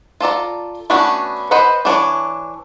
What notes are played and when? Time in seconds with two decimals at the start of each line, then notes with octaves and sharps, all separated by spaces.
0.20 F4 A4 D5 A#5
0.90 A3 B3 C#4 D4 F#4
1.51 B4 C5 D#5 F#5
1.85 E3 D4 G#4 C#5